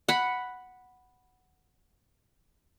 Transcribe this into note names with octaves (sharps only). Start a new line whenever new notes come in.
F#5 B5